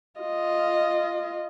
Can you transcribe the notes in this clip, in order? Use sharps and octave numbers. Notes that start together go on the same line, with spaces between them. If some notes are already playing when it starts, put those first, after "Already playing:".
F4 D#5